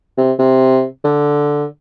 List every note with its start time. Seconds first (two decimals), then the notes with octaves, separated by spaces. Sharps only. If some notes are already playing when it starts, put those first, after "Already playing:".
0.17 C3
0.39 C3
1.04 D3